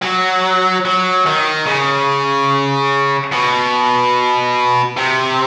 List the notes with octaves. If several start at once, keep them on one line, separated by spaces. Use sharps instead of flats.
F#3
F#3
D#3
C#3
B2
C3